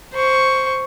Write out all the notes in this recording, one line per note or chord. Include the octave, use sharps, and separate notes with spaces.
C5 C#6